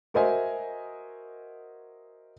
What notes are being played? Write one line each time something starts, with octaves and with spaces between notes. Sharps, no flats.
F#4 A#4 C5 D#5 E5 G#5